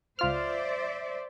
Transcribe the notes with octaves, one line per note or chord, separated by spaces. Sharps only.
C#2 F4 C5 D5 E5 F6